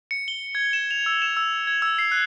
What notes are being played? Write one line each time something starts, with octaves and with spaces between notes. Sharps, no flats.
C#7
G7
G#6
E7
F7
E6
E7
E6
G#6
E6
C7
F#6